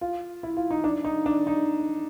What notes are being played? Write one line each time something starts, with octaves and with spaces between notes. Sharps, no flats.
F4
E4
F4
D#4
D4
D#4
D4
D#4